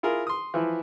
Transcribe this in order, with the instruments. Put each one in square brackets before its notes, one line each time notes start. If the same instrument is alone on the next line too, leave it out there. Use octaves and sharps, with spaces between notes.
[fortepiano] E4 F4 G#4 A#4
C6 D#6
E3 F3 E4